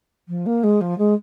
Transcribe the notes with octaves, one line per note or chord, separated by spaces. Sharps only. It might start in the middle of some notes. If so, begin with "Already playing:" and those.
F3
A#3
G#3
F3
G#3